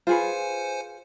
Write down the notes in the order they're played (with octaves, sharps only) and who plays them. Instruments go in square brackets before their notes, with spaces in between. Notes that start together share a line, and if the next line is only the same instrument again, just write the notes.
[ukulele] F4 G#4 B4 [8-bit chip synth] C5 G#5 C#7